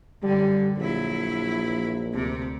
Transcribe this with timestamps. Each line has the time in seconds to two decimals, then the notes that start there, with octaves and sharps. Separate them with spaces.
0.23 F#2 D3 G3
0.77 A#1 F#3 E4
2.14 D2 C3